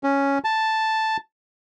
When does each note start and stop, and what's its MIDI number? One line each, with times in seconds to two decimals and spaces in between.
0.04 0.38 61
0.44 1.17 81